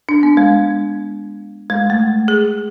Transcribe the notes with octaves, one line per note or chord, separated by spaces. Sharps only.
D4
B3
G#3
G#3
A3
G#4